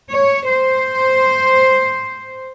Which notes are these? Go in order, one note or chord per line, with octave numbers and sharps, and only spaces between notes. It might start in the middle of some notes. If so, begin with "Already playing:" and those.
C#5
C5